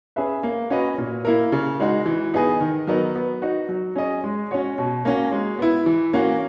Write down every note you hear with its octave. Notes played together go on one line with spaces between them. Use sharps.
C#4 G#4 B4 E5
A#3
C#4 F#4 B4 D#5
A#2
A#3 E4 A#4
C#3
G#3 D#4 F#4
E3
B3 D#4 G#4 D#5
D#3
F#3 B3 D#4 A#4
B3
D#4 F#4
F#3
C#4 G#4 D#5
G#3
C#4 F#4 C#5
B2
A#3 C#4 F#4
G#3
B3 E4
E3
A#3 C#4 F#4